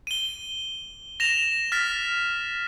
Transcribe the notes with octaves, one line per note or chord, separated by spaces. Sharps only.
D#7 G7
A#6 E7 F7
F6 A6 B6